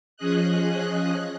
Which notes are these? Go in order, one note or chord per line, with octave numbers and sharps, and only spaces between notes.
F3 C#4 G#4 D#5 F#6